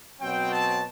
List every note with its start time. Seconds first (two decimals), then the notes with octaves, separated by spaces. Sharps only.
0.21 B2 F#3 C4 G5
0.52 A5